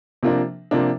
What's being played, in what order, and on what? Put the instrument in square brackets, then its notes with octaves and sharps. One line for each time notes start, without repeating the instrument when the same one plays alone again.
[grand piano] C3 F3 A#3 D4
C3 F3 A#3 D4